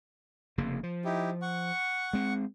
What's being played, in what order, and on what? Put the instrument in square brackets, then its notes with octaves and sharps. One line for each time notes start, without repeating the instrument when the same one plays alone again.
[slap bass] F1 C#3 A#3
F3
[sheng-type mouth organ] D#4 E4 G4
F#5 C#6
[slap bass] G#3 C4